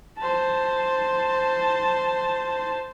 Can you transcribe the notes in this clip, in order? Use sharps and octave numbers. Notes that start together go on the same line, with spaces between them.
C5 A5